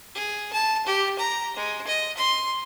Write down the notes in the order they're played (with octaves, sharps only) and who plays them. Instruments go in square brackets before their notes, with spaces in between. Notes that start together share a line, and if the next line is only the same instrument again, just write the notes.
[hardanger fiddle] G#4
A5
G4
A#5
G#3
D#5
C6